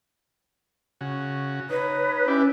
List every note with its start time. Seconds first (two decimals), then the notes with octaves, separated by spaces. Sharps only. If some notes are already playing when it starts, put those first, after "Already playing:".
1.01 C#3 F#4
1.70 D#4 B4 C#5
2.28 C#4 E4 G4 D5